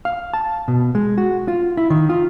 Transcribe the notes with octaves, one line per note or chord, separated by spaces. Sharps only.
F5
A5
B2
G#3
F#4
F4
E4
D#3
F4